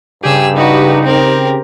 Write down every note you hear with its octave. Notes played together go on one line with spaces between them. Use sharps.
G2 C#3 G4 G#4 E6
D#4 F#4 B4
C4 A#4